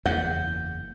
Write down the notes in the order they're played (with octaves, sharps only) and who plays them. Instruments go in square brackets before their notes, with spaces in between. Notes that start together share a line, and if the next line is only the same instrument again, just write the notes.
[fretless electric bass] F#1 A#3 B3 [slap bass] E2 [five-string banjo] F#5 [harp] G6